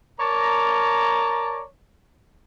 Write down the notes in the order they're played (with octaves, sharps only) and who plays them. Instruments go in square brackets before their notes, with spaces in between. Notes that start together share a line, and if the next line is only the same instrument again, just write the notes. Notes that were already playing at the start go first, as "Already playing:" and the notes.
[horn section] A#4 C#5 D5 A5 A#5